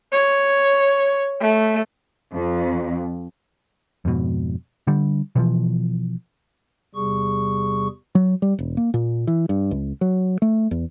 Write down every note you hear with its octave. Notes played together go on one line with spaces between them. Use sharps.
C#5
A3
F2
F2 G#2 B2
D3 G3
B2 E3 F3
E2 C3 G3 G#4 C#6
F#3
G3
E1
A#3
A#2
E3
G2
C#2
F#3
A3
E2